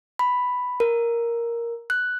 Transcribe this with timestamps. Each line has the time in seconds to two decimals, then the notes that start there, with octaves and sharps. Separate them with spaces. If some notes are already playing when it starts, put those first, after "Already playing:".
0.19 B5
0.80 A#4
1.90 F#6